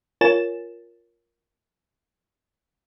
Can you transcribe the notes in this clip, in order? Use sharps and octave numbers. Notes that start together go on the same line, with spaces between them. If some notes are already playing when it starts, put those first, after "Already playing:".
F4 A#4 C#5 G#5 A6 E7